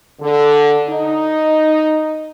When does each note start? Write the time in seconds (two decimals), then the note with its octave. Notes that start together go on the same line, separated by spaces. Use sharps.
0.20 D3
0.88 D#4